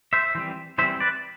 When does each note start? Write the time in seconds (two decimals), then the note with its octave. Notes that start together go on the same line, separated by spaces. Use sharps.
0.13 C5 E5
0.35 E3 G3 C4
0.78 E3 G3 C4 C5 E5
1.00 B4 D5